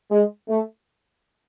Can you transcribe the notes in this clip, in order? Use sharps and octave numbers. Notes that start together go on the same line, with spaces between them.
G#3
A3